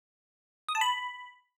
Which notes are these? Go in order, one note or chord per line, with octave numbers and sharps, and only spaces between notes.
D#6
A5
B5